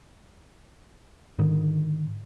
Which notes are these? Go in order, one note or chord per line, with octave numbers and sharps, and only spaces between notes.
G#2 D3 D#3